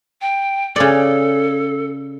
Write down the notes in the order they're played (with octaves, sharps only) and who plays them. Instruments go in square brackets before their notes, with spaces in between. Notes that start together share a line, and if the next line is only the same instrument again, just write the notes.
[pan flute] G5
[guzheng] C#3 D5 [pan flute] A4